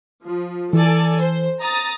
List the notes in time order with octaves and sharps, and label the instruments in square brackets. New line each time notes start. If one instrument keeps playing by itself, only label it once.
[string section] F3
[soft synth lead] E3 [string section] A4 D5 G#5
[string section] C5
A#5 D#6 A6